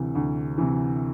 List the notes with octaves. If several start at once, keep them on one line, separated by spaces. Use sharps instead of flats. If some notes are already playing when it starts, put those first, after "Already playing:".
Already playing: D2 C3 E3
D2
C3 E3